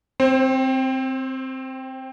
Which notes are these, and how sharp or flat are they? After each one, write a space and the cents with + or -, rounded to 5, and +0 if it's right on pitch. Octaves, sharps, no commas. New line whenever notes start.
C4 +0 C5 +35